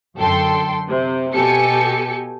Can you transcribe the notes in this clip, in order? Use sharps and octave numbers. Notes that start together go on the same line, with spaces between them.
F#2 D3 A4 G5 C6
C3
B2 G4 A4 G#5 C#7